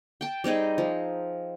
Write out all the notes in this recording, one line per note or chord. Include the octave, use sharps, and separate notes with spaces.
G5 A5
G3 C4 D#4 G#4
F3